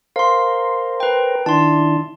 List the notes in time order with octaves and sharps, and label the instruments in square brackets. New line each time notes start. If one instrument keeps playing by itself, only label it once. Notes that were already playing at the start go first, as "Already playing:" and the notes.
[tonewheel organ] A#4 C5 [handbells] F5 C6
[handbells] B4 G5
[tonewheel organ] D#3 D4 E4 [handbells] A5 C6